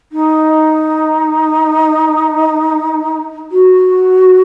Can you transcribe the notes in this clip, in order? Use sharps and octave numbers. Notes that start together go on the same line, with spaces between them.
D#4
F#4